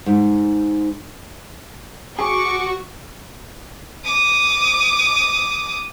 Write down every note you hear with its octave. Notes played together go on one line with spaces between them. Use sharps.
G#2
F#4 G#4 C#6 D6
D6 D#6